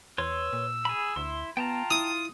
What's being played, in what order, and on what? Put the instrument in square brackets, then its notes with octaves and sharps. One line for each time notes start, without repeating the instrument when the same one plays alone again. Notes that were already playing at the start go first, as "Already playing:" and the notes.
[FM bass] E2 [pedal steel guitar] B4 C#5 C6 [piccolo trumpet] E6
[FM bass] A#2
[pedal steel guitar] G#4 B5
[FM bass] D2 [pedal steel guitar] E4 C6
[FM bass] B3 [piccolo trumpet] F4 [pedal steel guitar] G5 A5 A#5
[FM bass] E4 [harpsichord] D#6